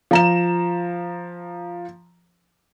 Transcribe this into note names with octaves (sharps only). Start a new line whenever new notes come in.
F3 A#5 E7